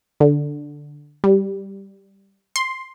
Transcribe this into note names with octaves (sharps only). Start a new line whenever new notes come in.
D3
G3
C6